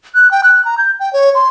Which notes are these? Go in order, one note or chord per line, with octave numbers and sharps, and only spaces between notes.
F#6
G5
F#6
A#5
G6
G5
C#5
C6